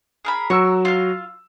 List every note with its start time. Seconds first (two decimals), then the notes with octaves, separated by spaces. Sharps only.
0.25 G#4 A#4 B5
0.50 F#3 F#4 A#4 C#6 E6
0.85 F4 F5